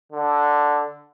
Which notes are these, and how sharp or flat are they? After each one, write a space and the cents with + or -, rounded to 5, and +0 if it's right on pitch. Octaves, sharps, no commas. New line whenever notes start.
D3 +0